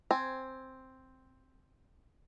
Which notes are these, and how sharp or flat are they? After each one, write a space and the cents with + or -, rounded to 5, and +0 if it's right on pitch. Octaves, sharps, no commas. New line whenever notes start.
C4 +0 G#5 +0